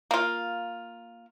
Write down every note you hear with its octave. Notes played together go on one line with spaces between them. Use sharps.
A#3 F4